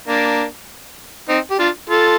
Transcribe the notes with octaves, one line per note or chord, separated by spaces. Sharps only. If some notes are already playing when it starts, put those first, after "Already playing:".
A#3 D4
C4 D#4
G4
D4 F4
F4 A4